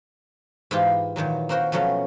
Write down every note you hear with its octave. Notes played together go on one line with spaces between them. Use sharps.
G#2 E3 F4 G4
A#2 D#3 E3 F#3
A#3 C4 F#4 A#4 C5 G5
B2 F3 F#3 A3 C#4